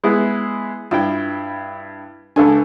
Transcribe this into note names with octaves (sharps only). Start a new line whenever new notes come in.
G#3 B3 E4
G2 E4 F4 G5
C#2 D4 A4 G#5